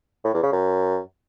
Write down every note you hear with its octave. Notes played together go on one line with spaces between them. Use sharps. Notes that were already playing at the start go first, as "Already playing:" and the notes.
A2
E2
C#3
F#2